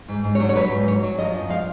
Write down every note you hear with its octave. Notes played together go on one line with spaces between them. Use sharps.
G#2
G#2
F#3 C#5
C#5
F#3 B4
G#2
F#3 C#5
F#3
F3 D#5
F#2
F3 F5